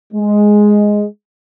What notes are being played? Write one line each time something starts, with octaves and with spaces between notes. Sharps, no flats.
G#3